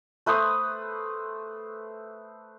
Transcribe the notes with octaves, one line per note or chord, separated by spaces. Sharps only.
A3 B4 C5 D#6